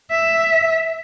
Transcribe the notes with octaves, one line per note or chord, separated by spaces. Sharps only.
E5